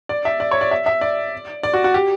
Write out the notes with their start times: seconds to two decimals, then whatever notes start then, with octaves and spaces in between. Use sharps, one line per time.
0.09 D5
0.25 E5
0.40 D5
0.51 C#5
0.61 D5
0.71 E5
0.86 E5
1.01 D5
1.63 D5
1.73 F#4
1.84 F#4
1.94 G4